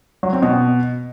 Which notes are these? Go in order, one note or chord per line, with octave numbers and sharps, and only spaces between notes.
F#3
C4
B2